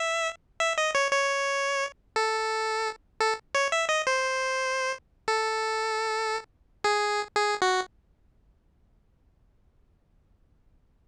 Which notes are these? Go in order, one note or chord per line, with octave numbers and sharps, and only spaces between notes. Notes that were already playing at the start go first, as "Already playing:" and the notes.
Already playing: E5
E5
D#5
C#5
C#5
A4
A4
C#5
E5
D#5
C5
A4
G#4
G#4
F#4